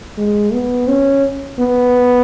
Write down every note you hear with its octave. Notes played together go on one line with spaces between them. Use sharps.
G#3
B3
C#4
B3